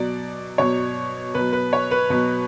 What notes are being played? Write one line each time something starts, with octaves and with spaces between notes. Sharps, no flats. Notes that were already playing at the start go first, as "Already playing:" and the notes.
Already playing: B2 F#3 D5
B2 F#3 C#5
B2 F#3 B4
B4
C#5
B4
B2 F#3